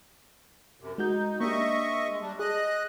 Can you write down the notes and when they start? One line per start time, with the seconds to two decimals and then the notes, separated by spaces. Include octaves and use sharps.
0.80 F#2 C3
0.98 G#3 D#4 F#4 G6
1.40 A#3 D4 G4 D#5 E5 C#6
2.10 G#3
2.22 G3 D4
2.39 G#4 D#5 F#6